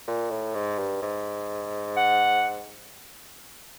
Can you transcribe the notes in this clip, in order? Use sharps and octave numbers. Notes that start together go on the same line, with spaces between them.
A#2
A2
G#2
G2
G#2
F#5